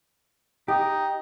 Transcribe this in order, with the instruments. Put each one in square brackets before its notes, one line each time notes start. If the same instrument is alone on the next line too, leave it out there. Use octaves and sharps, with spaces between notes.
[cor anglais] D#4 [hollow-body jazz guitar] G4